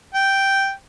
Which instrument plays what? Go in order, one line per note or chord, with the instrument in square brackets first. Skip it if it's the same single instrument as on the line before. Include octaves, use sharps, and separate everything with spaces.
[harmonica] G5